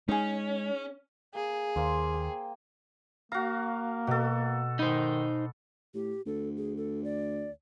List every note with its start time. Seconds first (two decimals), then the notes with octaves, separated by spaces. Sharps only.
0.09 G#3 C#4 D#4 G#4
1.35 A#3 G#4
1.76 D#2 A#3 C5
2.14 G5
3.32 A#3 F#4 F5 A#5
4.07 B2 F#4 A4
4.79 D#3 D#4 C5 B5 D#6
5.94 A2 G4
6.26 D2 A4
6.57 G#4
6.77 A4
7.04 D5